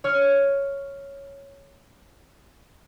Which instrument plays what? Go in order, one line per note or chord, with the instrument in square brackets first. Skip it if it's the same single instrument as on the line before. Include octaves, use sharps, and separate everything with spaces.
[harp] C#5 F6